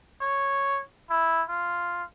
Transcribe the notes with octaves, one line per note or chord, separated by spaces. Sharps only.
C#5
E4
F4